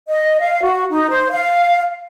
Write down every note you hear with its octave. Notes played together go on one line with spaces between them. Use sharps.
D#5
F5
F#4
D#4
C5
F5